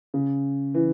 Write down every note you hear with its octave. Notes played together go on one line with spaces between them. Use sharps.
C#3
E3